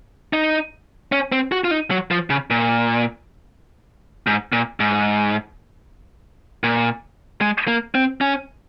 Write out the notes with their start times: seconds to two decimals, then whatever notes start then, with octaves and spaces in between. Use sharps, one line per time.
0.33 D#4
1.12 C#4
1.32 C4
1.52 F#4
1.64 F4
1.71 D#4
1.91 F#3
2.11 F3
2.30 C#3
2.50 A#2
4.27 G#2
4.53 A#2
4.80 G#2
6.64 A#2
7.41 G#3
7.68 A#3
7.95 C4
8.21 C#4